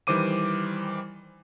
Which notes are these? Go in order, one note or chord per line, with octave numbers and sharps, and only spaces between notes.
D#3 E3 G3 C5 D6 D#7